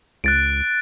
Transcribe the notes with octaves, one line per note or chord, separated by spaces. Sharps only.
C#2 F#6 A6 D7